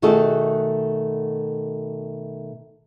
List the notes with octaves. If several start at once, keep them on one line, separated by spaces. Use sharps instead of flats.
B2 D#3 A3 F#4 G#4 A4